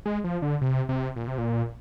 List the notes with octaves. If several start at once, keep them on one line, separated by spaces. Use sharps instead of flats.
G#3
F3
D3
C3
C3
A#2
C3
A#2